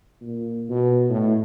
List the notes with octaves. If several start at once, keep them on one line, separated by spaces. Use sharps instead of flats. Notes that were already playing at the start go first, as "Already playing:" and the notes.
A#2
B2
A2